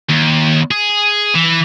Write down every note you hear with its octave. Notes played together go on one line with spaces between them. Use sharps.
D#2
G#4
E3